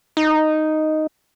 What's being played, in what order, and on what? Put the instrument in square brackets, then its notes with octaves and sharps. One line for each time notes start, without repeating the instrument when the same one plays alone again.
[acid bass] D#4